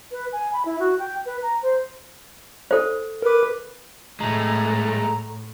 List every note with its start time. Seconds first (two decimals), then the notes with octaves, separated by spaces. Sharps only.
0.11 B4
0.33 G#5
0.53 B5
0.65 E4
0.80 F#4
0.99 G5
1.26 B4
1.42 A#5
1.62 C5
2.71 A4 C5
3.22 A#4 B4 D6
4.20 A2 G#3 A3 A#5